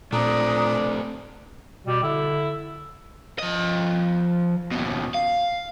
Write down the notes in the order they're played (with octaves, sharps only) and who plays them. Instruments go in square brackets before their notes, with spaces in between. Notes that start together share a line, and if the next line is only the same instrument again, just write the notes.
[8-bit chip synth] A#2 [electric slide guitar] A3 C4 [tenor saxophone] D4 [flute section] A#5 D#6
[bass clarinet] B2 [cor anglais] G3
[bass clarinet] D3 [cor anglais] E4
[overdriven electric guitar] F3 D#5
D#2 B2
F5